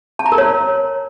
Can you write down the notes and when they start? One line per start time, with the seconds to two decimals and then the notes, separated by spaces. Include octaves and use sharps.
0.19 A5
0.26 A#5
0.32 A#4
0.38 C#5